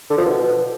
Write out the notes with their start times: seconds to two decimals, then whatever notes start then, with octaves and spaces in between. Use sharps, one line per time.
0.10 D3
0.18 F3
0.26 B2